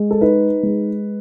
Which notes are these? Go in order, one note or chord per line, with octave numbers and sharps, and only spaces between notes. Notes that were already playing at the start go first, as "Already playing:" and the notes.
Already playing: G#3
A4
D#4 B4
G#3